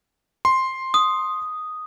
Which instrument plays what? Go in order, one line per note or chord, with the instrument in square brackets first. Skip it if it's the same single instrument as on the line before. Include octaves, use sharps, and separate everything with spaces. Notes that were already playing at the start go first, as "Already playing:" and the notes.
[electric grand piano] C6
[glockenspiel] D#6